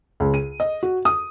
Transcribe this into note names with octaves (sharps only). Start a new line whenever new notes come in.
C#2
D#7
D#5
F#4
D#6